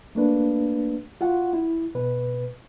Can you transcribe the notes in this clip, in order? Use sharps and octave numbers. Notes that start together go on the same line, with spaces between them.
A3 A#3 D4 B4
F4 F#4 F#5
E4
B2 B4